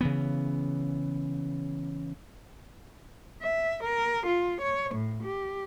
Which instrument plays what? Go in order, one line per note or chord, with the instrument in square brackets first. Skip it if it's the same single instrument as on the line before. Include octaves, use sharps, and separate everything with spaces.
[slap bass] C#3 E3 B3
[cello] E5
A#4
F4
C#5
A2
G4